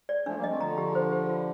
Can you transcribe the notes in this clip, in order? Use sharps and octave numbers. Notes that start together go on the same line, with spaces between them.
D5
F3 A3 D4
G3 A#3
D#5
A3 C4
D3 F3 A#5
G4
C5
G4
F4